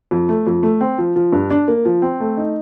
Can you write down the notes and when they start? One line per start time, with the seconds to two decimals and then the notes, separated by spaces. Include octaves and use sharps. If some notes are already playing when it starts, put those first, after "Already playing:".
0.11 F2
0.29 A3
0.47 F2
0.63 A3
0.81 C4
0.98 F3
1.16 F3
1.33 G2
1.50 D4
1.68 A#3
1.85 F3
2.02 C4
2.20 A3
2.37 D#4